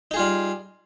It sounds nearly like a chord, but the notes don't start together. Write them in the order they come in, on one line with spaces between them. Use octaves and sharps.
D#4 G#4 F4 G3